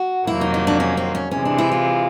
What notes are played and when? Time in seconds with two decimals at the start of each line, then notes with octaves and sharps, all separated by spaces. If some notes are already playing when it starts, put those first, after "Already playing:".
Already playing: F#4
0.27 F2 C3 D#3 F#3 A#3 E4
0.41 D#4
0.54 D#4
0.67 D4
0.80 C#4
0.97 C4
1.15 C#4
1.31 C3 E3 G#3 C#4
1.45 D4
1.58 E4
1.72 F4